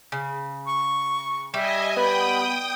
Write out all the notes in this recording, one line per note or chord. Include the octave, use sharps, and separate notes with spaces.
C#3
C#6
G3 D#5 E5 G#5
B3 G5 B5 D#6